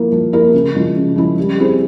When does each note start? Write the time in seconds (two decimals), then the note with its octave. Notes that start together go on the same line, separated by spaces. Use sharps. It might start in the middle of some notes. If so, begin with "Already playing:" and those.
Already playing: F3 A#3 E4 A#4
0.12 F3
0.33 A#3 E4 A#4
0.54 C#3
0.75 F3 G#3 C#4 E4
0.96 C#3
1.16 F3 G#3 C#4 E4
1.38 G3
1.58 C4 E4 G#4 C5